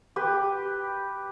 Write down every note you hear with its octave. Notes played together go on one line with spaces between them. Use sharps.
G4 B4